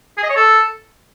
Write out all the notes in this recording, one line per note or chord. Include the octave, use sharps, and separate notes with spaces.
G#4
D#5
C#5
A4